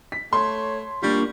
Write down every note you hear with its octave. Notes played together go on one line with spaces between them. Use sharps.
B6
A3 C#5 C6
G3 A#3 D4 F4 C#6